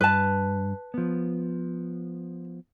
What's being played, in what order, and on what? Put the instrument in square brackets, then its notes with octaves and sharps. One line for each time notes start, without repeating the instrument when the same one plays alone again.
[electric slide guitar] G2 [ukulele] B4 A5
[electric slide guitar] F3 B3